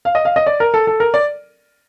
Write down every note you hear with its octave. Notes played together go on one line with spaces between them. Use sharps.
F5
D#5
F5
D#5
D5
A#4
A4
A4
A#4
D5